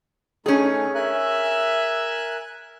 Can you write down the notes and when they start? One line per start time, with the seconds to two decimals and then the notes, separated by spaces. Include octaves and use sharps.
0.46 A3 C#4 D#4 G#4
0.95 A#4 E5 G#5 F#6